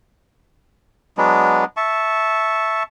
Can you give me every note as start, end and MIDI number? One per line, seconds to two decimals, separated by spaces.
1.18 1.65 54
1.18 1.65 56
1.18 1.65 59
1.18 1.65 62
1.77 2.83 76
1.77 2.83 81
1.77 2.83 85